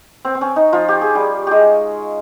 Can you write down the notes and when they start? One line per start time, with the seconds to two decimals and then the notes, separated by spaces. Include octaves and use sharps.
0.25 C4
0.35 C4
0.41 C#4
0.56 D#4
0.73 F3 F4
0.88 G4
1.01 G#4
1.15 G3 G4
1.47 G#3 G4 G#4